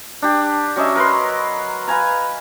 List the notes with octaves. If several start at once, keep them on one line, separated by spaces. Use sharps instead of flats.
D4 G4
F#3 C#4 D#5 E5
A#4 B4 C6
B4 F5 G#5 A#5